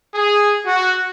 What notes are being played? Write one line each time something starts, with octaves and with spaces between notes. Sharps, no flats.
G#4
F#4